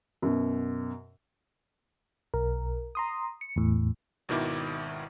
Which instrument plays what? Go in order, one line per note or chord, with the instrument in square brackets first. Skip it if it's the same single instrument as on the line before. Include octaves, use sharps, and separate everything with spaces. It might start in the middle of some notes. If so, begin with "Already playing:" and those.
[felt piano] F#2 B2
[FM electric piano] B1 A#4
A#5 C6 D#6
C#7
E2 A2
[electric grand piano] G#1 B2 D#3 E4 D6